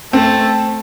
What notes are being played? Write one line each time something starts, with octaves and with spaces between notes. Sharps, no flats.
A3 C4